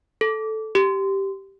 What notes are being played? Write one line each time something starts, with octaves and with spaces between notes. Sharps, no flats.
A4
G4